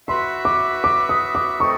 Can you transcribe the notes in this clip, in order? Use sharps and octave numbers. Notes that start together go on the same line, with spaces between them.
F#4 B4 E5 C6
D6
D6
D#6
D6
A3 C4 D#4 C#6